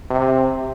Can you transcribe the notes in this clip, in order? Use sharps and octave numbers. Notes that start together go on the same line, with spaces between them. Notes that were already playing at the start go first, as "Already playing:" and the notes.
C3